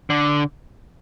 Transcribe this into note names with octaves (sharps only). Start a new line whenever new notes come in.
D3